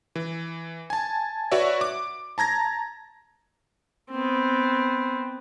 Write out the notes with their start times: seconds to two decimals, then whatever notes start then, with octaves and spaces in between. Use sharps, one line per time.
0.15 E3
0.90 G#5 A5
1.52 F#4 B4 C#5 D5 E5
1.81 D6
2.38 A5 A#5 G#6 A#6
4.11 B3 C4